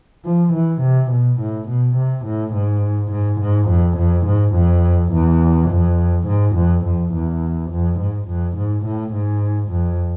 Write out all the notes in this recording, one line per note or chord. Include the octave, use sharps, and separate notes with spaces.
F3
E3
C3
B2
A2
B2
C3
A2
G#2
G#2
G#2
F2
F2
G#2
F2
E2
F2
G#2
F2
F2
E2
F2
G#2
F2
G#2
A2
G#2
F2